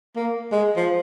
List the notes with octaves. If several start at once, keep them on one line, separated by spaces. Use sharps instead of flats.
A#3
G#3
F3